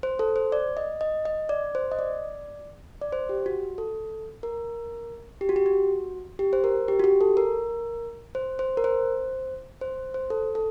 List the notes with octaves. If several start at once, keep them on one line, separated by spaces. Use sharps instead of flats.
C5
A4
C5
D5
D#5
D#5
D#5
D5
C5
D#5
D5
D5
C5
G4
F#4
A4
A#4
G4
F#4
G4
F#4
G4
C5
A#4
G4
F#4
G4
A4
A#4
C5
C5
A#4
C5
C5
C5
A4
A4